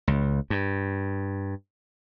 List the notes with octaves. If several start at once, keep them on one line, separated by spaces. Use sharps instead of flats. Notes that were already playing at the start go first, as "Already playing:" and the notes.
C#2
G2